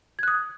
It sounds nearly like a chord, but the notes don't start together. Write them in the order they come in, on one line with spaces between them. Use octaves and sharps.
G#6 F#6 D#6